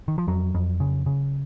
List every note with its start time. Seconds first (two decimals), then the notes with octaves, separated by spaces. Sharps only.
0.08 D#3
0.18 F3
0.27 F2 F#3
0.54 F2
0.80 C#3
1.06 C#3